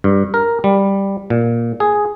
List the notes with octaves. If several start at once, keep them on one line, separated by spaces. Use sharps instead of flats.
G2
A#4
G3
A#2
G#4